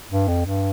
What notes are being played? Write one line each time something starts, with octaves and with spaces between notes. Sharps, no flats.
G2
F2
G2